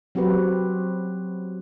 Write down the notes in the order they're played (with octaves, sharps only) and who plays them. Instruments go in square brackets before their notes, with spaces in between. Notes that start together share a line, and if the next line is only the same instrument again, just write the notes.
[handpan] F#3 C4 F#4 G4 B4